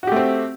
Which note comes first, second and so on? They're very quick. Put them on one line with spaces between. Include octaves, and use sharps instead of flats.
F#4 G4 A3 C4